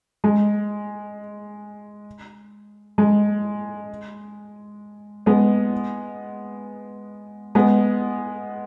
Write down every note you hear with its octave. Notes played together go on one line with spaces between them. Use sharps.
G#3
G#3
G#3 B3
G#3 B3